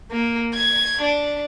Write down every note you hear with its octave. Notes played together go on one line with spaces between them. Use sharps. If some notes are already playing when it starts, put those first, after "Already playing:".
A#3
G#6
D4